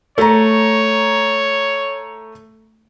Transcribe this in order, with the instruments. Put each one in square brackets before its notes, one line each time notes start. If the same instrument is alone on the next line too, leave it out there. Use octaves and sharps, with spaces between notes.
[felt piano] A3 A#5 [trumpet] C#5